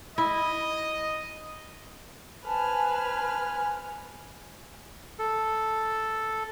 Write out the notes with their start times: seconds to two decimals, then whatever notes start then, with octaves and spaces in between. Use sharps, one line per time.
0.18 E4 D#5
2.46 B4 C5 G#5 A5 F6
5.19 A4